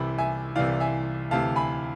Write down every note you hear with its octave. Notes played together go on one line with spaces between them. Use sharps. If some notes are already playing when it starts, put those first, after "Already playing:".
Already playing: C2 C3 E3 B5
E5 G#5
C2 C3 E3 D5 F5
E5 G#5
D2 C3 E3 F5 A5
G#5 B5